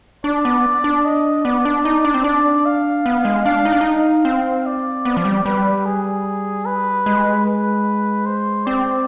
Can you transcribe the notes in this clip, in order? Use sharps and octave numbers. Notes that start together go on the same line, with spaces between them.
D4 D5
B3
D4
D#5
B3 D5
D4
D#4
D4
C4
D4 D5
F5
B3
G#3
D4 F5
D#4
D4
D#4 F5
C4
D5
B3
F3
G3
G3 B4
G#4
B4
G#3
B4
C5
C4 D5